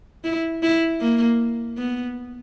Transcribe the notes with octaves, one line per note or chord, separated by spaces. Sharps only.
E4
E4
A#3
B3